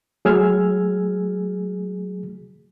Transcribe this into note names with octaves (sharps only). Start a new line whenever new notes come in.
F#3 A3 G#4 E6 F6 G#6